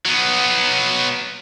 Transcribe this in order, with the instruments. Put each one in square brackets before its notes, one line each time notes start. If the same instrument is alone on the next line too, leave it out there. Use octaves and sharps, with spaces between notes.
[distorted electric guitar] F#3 B3